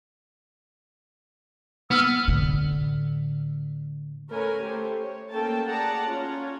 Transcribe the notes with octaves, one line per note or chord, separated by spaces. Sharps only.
B3 E6 F6
A2 D3
A3 C#4 A#4 B4 C#5 G#5
A3 G4 C5
C#5
A3 A#3 C#4 A4 G5 A5
G#4 D5 F#5 A5 A#5
C#4 F4 C#5